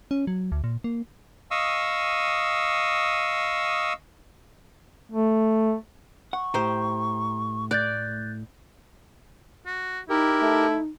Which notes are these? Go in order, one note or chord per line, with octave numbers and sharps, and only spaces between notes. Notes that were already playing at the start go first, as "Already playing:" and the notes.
C#4
F#3
D2
A#2
A#3
D#5 F5 C#6 D#6 E6
A3
F#5 C#6
A2 G4 C5 A#5
A3 D5 F#6 G6 A6
F#4
D#4 E4 G4 A#4
A3